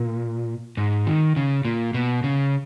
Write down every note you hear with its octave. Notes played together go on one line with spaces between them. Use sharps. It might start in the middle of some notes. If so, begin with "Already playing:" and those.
Already playing: A#2
G#2
D#3
C#3
A#2
B2
C#3